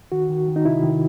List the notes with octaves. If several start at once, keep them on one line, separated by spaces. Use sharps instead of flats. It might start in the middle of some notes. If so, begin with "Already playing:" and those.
D#3 F#4
D#3
D#3
D#4
C3 E4
D#3